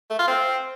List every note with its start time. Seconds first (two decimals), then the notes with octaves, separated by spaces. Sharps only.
0.10 A3
0.19 F4
0.28 C4